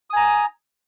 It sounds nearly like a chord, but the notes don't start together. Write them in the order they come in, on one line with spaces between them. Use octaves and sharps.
D#6 G#5 A#5